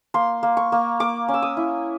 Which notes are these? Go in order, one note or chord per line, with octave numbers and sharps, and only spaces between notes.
A#3 C6
A#3
C#6
A#3
A#3 D6
C#4
E6
D#6
E4